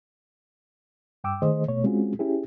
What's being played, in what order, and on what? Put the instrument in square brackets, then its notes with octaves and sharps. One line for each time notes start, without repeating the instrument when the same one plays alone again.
[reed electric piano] G2 G5 D6 E6
D#3 A3 G#4 C5 D#5
B2 A3 C#5
G#3 C4 C#4 F4 F#4 G#4
C#4 E4 G4 G#4